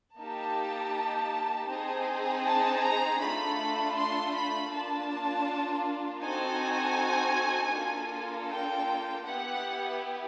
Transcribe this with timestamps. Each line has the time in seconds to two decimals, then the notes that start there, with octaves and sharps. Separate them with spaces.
0.18 A#3 D#4 G4 A5
1.69 C4 D#4 G#4
2.45 A5
2.83 A#5
3.20 A3 D4 F4 A4 B5
3.96 C6
4.34 B5
4.71 A#3 D4 F4 A5
6.22 C4 D#4 F#4 A4 G#5
7.73 A#3 D4 F4 A4
8.50 G5
9.25 B3 E4 G4 F#5